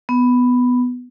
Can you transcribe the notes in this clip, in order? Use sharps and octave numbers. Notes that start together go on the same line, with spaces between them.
B3